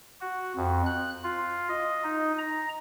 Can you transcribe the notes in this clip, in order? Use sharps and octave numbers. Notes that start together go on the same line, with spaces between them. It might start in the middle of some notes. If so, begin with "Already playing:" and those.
F#4
F2
F#6
F4
D#5
D#4
A#5